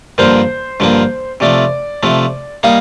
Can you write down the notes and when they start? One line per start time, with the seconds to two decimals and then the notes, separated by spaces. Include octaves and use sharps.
0.18 G2 D3 F3 A#3 C5
0.80 G2 D3 F3 A#3
1.40 C3 F3 A3 D5
2.03 C3 F3 A3
2.63 G3 A#3 D#4 F5